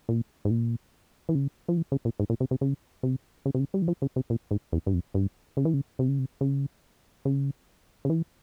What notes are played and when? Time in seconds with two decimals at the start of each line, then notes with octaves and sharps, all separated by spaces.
0.09 A#2
0.45 G#2
0.51 A#2
1.29 E3
1.35 C#3
1.68 F3
1.77 E3
1.92 C#3
2.05 A#2
2.20 G#2
2.30 A#2
2.40 C3
2.51 C3
2.61 C#3
3.03 C3
3.46 C#3
3.55 C3
3.60 C#3
3.74 G3
3.82 E3
3.88 F3
4.02 C#3
4.16 C3
4.30 A#2
4.51 G#2
4.72 E2
4.86 G2
4.94 F2
5.14 G2
5.57 C#3
5.65 E3
5.74 C#3
5.99 C3
6.09 C#3
6.19 C3
6.41 C#3
7.25 C#3
8.05 C#3
8.10 E3